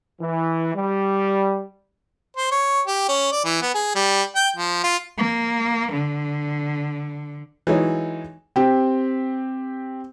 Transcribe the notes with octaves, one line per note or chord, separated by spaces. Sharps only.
E3
G3
C5
C#5
G4
C#4
D5
E3
B3
G#4
G3
G5
F3
F4
A#3
D3
E3 F#3 G#3 D#4 C#5
C4 G4